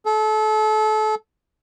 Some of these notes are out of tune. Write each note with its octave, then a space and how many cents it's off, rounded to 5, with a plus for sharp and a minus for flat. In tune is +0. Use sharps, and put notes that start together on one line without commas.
A4 -30